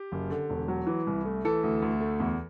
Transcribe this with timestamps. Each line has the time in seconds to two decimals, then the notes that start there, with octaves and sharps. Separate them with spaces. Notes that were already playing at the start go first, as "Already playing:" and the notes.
Already playing: G4
0.12 F#1
0.30 D3
0.50 E1
0.68 F#3
0.87 E3
1.07 C2
1.25 A3
1.45 E3 A4
1.63 D2
1.82 D2
2.01 A3
2.20 E2